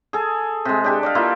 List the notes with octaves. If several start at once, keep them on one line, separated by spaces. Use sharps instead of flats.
G#4 A4
C3 G#3
D4 G4 A4
D5 D#5 F5
A#3 E4 F4 A4